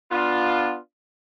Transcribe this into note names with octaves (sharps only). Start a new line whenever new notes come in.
B3 D4 F4